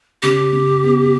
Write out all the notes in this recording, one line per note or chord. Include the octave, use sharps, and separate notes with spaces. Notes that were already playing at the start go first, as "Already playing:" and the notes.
C#3 G4
C#3
B3